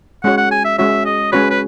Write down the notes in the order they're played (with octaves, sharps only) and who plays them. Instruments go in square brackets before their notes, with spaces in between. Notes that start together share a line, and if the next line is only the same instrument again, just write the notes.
[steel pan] G#3 C#4 F#4 C#5 [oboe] F#5
[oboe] F#5
G#5
E5
[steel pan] G#3 C#4 F#4 C#5 [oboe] E5
[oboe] D#5
[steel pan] G#3 C#4 F#4 C#5 [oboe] B4
[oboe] B4